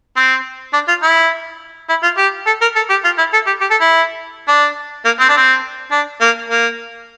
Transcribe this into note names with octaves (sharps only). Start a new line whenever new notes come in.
C4
D4
F4
E4
E4
F4
G4
A4
A#4
A4
G4
F4
E4
A4
G4
G4
A4
E4
D4
A#3
C4
D4
C4
D4
A#3
A#3